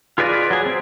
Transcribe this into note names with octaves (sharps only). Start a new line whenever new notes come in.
F4 G#4 B4 D5 D#5
F#3 G#4
C4